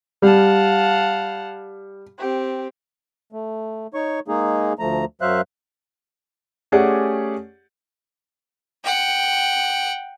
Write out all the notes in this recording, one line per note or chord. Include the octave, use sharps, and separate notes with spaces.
G3 F5 F#5 A5
C4 G4
A3
D#4 C#5 C#6
G#3 A#3 D#4 G#4
D2 F3 A3 A#5
F#2 F#3 C5 E5 F5 F#6
A3 C#4 G4 G#4 D5 F#5
F#5 G5